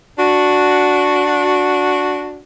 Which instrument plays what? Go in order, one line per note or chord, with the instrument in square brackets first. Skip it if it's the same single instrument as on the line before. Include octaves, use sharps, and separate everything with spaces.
[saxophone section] D4 F#4